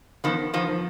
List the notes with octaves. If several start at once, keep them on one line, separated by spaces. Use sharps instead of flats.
D#3 F3 B3
D#3 F3
F3